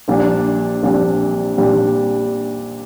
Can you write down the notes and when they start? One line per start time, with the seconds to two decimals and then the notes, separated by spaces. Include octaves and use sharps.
0.08 A#1 A#2 G3 D4
0.83 A#1 A#2 G3 D4
1.58 A#2 G3 D4